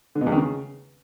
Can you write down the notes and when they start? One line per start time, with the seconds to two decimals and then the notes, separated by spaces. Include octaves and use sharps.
0.15 D3
0.21 B2
0.26 E2
0.32 D#3
0.38 C#3